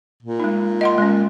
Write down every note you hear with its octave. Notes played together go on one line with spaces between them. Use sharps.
A#2
G#3 D#4
D#5 F#5 C6
G#3 C#4